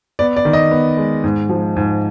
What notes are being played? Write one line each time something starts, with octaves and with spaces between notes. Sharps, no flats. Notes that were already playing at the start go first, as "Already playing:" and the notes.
B3 D5
D5
D#3
D#5
B3
G#3
G#2
F3
G#2